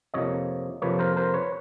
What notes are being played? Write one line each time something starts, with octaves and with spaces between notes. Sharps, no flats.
F2 C3 F3 A#3 C#5 D#5
F2 C3 F3 A#3 B4 C#5
A#4 C5
A#4 C5
B4 C#5